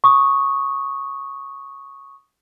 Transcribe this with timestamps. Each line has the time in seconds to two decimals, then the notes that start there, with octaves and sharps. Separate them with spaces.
0.04 C#6 D#6